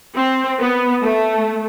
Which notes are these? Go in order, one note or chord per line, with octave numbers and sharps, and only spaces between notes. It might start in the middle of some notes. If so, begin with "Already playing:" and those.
C4
B3
A3